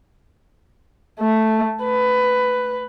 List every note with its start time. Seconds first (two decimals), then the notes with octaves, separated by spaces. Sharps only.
1.20 A3
1.84 B4